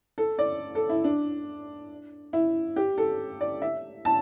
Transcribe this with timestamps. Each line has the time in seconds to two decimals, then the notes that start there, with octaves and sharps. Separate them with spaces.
0.18 A4
0.39 D5
0.75 A4
0.89 E4
1.04 D4
2.33 E4
2.76 G4
2.98 A4
3.41 D5
3.62 E5
4.05 A5